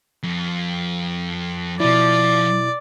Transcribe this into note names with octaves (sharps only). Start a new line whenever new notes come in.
F2
B2 F3 E4 D5